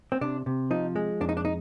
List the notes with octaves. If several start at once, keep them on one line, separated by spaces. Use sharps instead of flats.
C4
C3 D4
C3
F3 D#4
G#3
F2 D4
D#4
D4
D#4